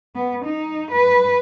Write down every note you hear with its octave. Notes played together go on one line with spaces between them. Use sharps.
B3
D#4
B4